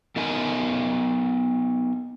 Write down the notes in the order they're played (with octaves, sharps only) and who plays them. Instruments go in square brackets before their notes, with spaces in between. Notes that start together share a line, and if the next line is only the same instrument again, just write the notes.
[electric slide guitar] B3 D#4 A#4 D#5 G#5